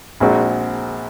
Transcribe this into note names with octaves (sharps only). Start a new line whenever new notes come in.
A#1 A#2 G#3 C4 F#4